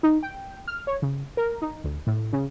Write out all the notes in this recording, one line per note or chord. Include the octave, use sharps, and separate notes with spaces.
D#4
G5
F6
C#5
C#3
A#4
D#4
D2
A2
C#3